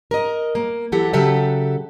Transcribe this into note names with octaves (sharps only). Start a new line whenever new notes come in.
A#4 D#5
A#3
E3 F#3 E4 G4 A4 F#5
C#3 F#3 G4 A4 E5 F#5